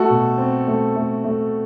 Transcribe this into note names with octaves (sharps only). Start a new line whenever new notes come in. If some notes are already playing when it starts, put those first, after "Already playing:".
Already playing: A3 F#4 A4
B2
C4
A3
A3
A3